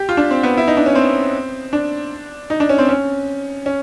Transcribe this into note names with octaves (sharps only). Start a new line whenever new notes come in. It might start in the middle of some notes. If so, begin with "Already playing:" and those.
Already playing: G4
F4
D4
C4
B3
E4
D#4
D4
C#4
C4
D4
D#4
D4
C#4
C4
C#4
C#4